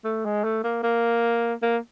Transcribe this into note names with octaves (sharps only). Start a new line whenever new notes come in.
A3
G#3
A3
A#3
A#3
A#3